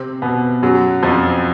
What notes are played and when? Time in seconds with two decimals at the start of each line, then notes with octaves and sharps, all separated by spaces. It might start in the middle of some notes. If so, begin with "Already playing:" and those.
Already playing: C3 C4
0.22 B2 B3
0.63 F#2 F#3
1.03 F2 F3